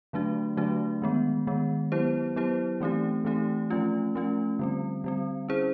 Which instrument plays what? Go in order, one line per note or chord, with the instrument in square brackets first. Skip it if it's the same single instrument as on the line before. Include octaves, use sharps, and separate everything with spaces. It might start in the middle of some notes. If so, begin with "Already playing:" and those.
[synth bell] D3 F#3 A3 D4 F#4
D3 F#3 A3 D4 F#4
D#3 G#3 B3
D#3 G#3 B3
F#3 B3 E4 G4 C5
F#3 B3 E4 G4 C5
E3 A3 C4 D#4 G4
E3 A3 C4 D#4 G4
F3 A3 C#4 F4
F3 A3 C#4 F4
D3 G3 C4
D3 G3 C4
C#4 E4 G#4 C5